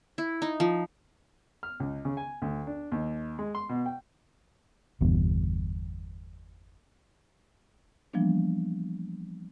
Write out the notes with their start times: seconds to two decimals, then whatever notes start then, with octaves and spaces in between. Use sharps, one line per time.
0.18 E4
0.42 D#4
0.60 F3
1.63 F6
1.80 C#2
2.05 C#3
2.17 G#5
2.42 D2
2.67 D4
2.92 D#2
3.39 G#3
3.55 C6
3.69 B2
3.86 G5
5.01 G1 E2 G2 B2
8.13 E3 F3 G3 A#3 B3 D4